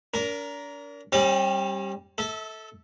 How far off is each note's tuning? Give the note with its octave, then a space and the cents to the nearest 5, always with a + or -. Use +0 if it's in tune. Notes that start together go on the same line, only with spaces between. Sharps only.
D4 -40 A#4 +5
G3 +0 C#4 -45
A4 +0 E5 -30